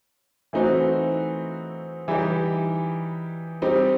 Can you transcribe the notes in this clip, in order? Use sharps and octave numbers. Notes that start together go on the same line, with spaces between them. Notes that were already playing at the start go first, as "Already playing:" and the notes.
E3 A3 C4 D#4 F#4
E3 G3 D#4 G4
G3 C4 D#4 G4